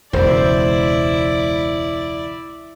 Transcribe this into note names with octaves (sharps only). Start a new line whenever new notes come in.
E1 C#2 E4 C5 D5